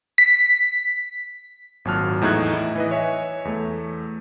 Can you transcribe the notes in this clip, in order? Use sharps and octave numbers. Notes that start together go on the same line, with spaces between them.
B6
G#1 A#2 F#3 A5 F6 F#6
E2 A2 D#4 G#4 F#6 G#6
E4
E3 B4 D#5
C#5 E5 G#5
E2 A3